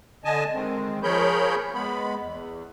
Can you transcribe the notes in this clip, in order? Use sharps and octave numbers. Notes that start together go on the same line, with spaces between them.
D3 D#5 G#5 A5
D#3 G#3 C4
F3 G#4 A#4 C#5 B5 G6
G#3 B3 B5
E2